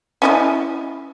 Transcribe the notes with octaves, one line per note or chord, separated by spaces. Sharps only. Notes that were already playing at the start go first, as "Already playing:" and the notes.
C#4 E4 D#5